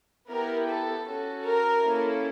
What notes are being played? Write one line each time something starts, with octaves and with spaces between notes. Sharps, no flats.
B3 E4 G4 A#4
A4
C#4 F#4 A4
A#4
A#3 C#4 E4 A4